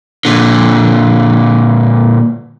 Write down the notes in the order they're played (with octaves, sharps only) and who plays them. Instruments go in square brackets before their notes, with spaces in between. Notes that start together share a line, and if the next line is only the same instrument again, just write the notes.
[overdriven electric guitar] A#2 D3